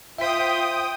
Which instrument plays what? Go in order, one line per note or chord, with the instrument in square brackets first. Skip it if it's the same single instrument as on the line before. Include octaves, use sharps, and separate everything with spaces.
[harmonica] F4 [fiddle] C5 [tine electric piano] E5 B6 [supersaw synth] G5 D#6